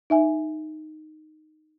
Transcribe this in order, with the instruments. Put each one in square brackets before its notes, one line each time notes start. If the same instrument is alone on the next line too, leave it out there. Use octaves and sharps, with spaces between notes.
[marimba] D#4 E5 G#5